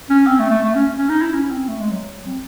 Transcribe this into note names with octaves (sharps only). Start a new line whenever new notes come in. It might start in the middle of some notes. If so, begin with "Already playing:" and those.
C#4
C4
A3
A3
A3
C#4
C#4
D#4
E4
C#4
C4
A3
G#3
F#3
C4